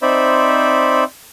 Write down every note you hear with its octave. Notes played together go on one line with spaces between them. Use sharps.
C4 D#4 C5 D5 E5 B5